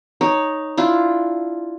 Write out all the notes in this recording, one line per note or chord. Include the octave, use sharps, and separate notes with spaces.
D#4 C#5
D4 E4 F4